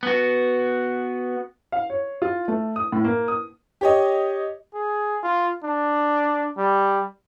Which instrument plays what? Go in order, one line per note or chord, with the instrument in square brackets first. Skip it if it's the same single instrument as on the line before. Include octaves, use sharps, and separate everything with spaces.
[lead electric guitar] B3 F#4
[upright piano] F5
C#5
F4
A3
D#6
A2
A#3
D#6
G4 C#5 D#5
[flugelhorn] G#4
F4
D4
G3